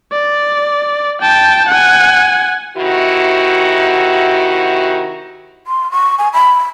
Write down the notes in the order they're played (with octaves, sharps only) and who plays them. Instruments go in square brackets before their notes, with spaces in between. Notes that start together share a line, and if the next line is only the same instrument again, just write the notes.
[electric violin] D5
G5 A5
F#5 G#5
[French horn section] C3 D#3 E4 F#4
[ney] C6
C#6
G#5
B5